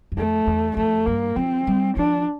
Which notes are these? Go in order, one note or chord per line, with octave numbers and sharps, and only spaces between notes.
G2
F2 A3
E2
F2 A3
G2 A#3
F3 C4
G3
F3 D4